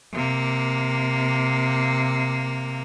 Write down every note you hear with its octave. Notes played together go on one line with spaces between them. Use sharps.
C3 A#3